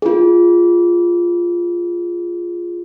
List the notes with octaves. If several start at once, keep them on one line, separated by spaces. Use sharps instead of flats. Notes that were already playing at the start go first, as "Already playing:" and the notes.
F4 G#4